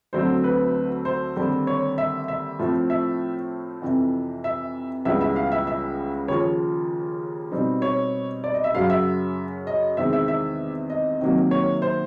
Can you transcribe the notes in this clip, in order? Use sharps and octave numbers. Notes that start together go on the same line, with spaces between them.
D2 D3 F#3 A3 C4 C5
B4
C5
D#2 D3 G3 C4
C#5
E5
E5
A2 F3 A3 C4
E5
F2 C3 E3
E5
C#2 C#3 E3 G3 B3 E5
E5
F5
E5
E5
D#2 C#3 F3 C#5
B2 G3 C4 D#4
C#5
D5
D#5
E5
F#2 C#3 F#3 F5
E5
D#5
E2 C3 D#3 G#3 C4 E5
E5
E5
D#5
C3 D#3 F#3 A#3
C#5
C5